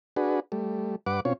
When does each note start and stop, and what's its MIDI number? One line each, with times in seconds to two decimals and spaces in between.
0.16 0.40 62
0.16 0.40 66
0.16 0.40 68
0.16 0.40 71
0.52 0.96 55
0.52 0.96 57
1.06 1.20 43
1.06 1.20 71
1.06 1.20 78
1.06 1.20 86
1.25 1.33 47
1.25 1.33 60
1.25 1.33 61
1.25 1.33 65
1.25 1.33 73